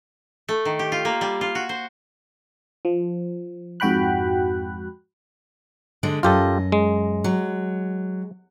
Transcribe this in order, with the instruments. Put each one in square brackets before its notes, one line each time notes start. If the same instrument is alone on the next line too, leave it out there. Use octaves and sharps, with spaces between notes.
[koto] A3
D#3
G4
F4
A#3
G3
F4
F#4
C5
[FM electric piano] F3
F2 G#2 F#4 G5 B5 F#6
[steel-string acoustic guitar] D3 G#3
[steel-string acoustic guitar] F#2 D#5 [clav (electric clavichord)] F4 G4 A4
[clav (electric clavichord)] G#3
[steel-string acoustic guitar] F#3